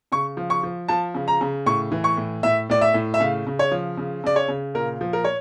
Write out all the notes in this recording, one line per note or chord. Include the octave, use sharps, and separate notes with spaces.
C#3 C#6
F3
C#6
F3
F3 A5
C#3
A#5
C#3
A2 C#6
E3
C#6
A2
A2 E5
A2 D5
E5
A2
E5
C#3 F5
C#3
C#5
F3
C#3
C#3 D5
C#5
C#3
A#2 A#4
F3
A#4
C#5